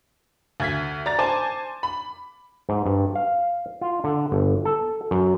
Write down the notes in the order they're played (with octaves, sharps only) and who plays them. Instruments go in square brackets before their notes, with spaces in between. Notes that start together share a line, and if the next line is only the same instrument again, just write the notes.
[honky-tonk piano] D2 G#6 B6
D5 A#5 A6
C5 G#5 A5 D6
B5
[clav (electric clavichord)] G#2
G2
F5
F4
D3
G1
A4
F#2